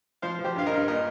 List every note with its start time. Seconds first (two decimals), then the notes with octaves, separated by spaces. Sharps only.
0.22 F3 C5 F5
0.39 F3
0.44 G4 C5
0.56 G2 F5
0.66 A#4 D#5
0.72 G2
0.88 A#2 A#4 D#5